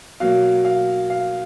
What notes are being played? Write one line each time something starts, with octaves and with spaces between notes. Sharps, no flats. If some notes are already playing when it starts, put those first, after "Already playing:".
B2 F#3 A#3 F5
F5
F5